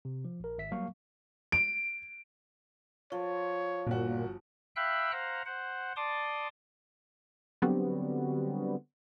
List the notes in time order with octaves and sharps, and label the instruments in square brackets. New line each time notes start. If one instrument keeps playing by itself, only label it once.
[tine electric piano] C3
F3
A#1 A#4
G#1 E5 B6
F#3 G3 A#3 F5 C#6
[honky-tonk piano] D7
[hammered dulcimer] F3 [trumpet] C#5
[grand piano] G1 F#4 [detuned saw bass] A#2
[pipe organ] E5 F5 G5 B5 E6 F#6
C5 F5 F#5 A#5
C5 F#5
D5 A5 C6 D6 D#6
[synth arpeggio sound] D3 F#3 G3 B3 C4 F#4